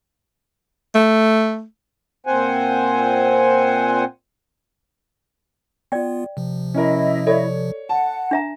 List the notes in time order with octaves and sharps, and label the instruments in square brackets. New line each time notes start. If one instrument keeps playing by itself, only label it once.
[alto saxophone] A3
[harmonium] A#2 C4 C5 F#5 G#5
[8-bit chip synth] B3 F4 [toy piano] D5 G5
[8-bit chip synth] C3 F3
[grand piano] C#4 A#4 [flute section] E4 D#5 E5
[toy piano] A4 D5 [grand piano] C#5
[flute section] F#5 [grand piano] A5
[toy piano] D4 E5 A#5